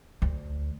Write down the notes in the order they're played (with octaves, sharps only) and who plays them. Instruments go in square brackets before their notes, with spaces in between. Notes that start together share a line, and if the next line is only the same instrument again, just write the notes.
[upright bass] D2